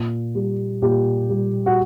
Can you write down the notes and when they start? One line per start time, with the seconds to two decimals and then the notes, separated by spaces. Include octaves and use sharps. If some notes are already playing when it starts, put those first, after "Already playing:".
Already playing: A#2
0.35 G3
0.82 A#2 G4
1.29 G3
1.66 F#4